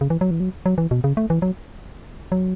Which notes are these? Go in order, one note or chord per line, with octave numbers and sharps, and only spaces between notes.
C#3
E3
F#3
E3
F#3
F#3
E3
B2
C#3
A3
E3
F#3
F#3